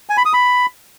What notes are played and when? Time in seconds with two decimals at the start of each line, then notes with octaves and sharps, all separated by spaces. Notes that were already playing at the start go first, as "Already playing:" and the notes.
0.09 G#5
0.17 B5
0.25 D#6
0.33 B5